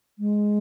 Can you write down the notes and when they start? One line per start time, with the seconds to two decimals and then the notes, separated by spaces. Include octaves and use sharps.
0.19 G#3